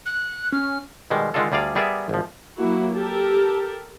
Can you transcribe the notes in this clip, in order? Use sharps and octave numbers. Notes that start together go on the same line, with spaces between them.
F#6
C#4 F6
B2 D#3 G3 G#3
D3 D#3 G#3 D4 F4 A4
D2 G3 G#4 D5 F5
G3 B3 G#4 A#4 D5 E5
G#1 F3
F#3 A#3 E4 F#4
G4 A4 A#4